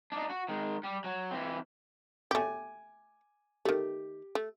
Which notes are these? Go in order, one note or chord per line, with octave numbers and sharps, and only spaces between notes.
D4 D#4
F#4
D#3 G#3
G3
F#3
E3 C4
A3 G4 G#5 D6
D#3 A3 G4
A3